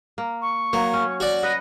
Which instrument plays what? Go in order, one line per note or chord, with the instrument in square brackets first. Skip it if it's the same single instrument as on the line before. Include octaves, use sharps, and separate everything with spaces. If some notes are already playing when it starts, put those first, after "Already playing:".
[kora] A#3
[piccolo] C#6
[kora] F#3 [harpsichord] A#3
[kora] C#4
[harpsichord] F#4 D5
[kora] B4 D#5 F#5 [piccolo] A#6